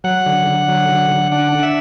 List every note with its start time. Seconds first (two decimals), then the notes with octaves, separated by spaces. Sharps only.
0.04 F#3 F#5
0.26 D3
0.47 D3
0.68 F#3
0.89 D3
1.11 D3
1.32 D4 F#5
1.52 D4
1.63 E5